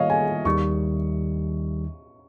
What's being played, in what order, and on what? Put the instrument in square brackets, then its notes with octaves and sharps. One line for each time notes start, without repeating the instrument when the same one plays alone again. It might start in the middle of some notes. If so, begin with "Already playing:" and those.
Already playing: [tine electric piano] D#3 G3 A#3 F4 G#4 [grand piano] C#5 D#5 F5
[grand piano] G#5
[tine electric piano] D#2 D#3 G3 [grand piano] C#6